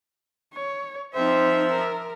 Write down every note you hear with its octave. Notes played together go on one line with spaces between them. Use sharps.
C#5
F3 C4 D#4 C5 E5
A#4